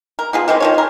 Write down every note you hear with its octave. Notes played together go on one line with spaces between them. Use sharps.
A#4
B2 F4 G#4
D#3 E3 G#3 C4
D#3 F3 C#5
C#4 A#4